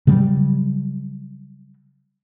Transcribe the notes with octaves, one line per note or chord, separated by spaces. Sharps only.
C#3 F#3 G3